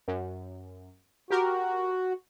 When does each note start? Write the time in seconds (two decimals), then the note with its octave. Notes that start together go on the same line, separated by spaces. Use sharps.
0.08 F#2
1.31 F#4 G4 A#4